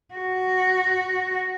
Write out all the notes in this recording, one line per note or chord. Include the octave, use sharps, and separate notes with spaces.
F#4